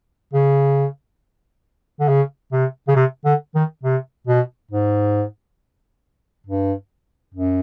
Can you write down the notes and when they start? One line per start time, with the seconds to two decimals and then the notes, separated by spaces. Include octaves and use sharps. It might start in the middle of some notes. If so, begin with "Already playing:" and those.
0.34 C#3
2.00 D3
2.09 C#3
2.52 C3
2.88 C#3
2.96 C3
3.25 D3
3.55 D#3
3.83 C3
4.27 B2
4.71 G#2
6.47 G2
7.34 F#2